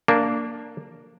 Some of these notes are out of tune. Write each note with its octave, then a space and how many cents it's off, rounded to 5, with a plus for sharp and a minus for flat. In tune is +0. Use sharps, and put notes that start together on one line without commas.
A#3 -10 D4 +0